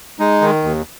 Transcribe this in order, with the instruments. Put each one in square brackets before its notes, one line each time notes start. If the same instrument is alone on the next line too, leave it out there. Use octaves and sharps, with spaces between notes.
[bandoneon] G#3 D#4
D#3
D#2